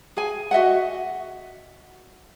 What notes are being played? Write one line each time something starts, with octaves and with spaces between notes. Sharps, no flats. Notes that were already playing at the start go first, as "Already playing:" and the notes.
G#4 G#5
F#4 D#5 E5 F#5